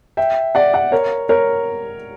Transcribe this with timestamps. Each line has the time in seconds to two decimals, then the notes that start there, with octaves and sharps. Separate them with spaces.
0.17 E5 G5
0.55 D5 F#5
0.74 D5 F#5
0.92 A#4 C#5
1.29 A#4 C#5